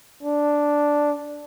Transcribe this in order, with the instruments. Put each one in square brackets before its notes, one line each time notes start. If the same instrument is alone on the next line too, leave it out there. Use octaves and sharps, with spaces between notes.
[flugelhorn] D4